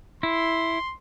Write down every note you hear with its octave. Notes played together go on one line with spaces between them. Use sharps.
E4 C6